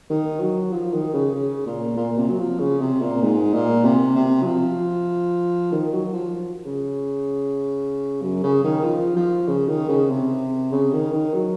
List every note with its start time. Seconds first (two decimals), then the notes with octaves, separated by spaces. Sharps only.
0.10 D#3
0.40 F#3
0.73 F3
0.93 D#3
1.14 C#3
1.35 C#3
1.66 A#2
1.97 A#2
2.18 C3
2.29 F#3
2.39 F3
2.59 C#3
2.81 C3
3.02 A#2
3.23 G#2
3.54 A#2
3.84 C3
4.16 C3
4.43 F#3
4.47 F3
5.72 D#3
5.93 F#3
6.13 F3
6.66 C#3
8.22 F#2
8.43 C#3
8.64 D#3
8.84 F3
9.16 F3
9.48 C#3
9.68 D#3
9.89 C#3
10.10 C3
10.72 C#3
10.93 D#3
11.13 D#3
11.34 F#3